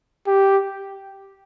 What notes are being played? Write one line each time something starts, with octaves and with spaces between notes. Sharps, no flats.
G4